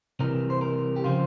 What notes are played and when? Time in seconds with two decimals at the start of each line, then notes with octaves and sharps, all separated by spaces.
0.19 C2 C3 E3 A#4
0.50 C5
0.61 A#4
0.96 G4
1.04 C#3 F3 C4 F4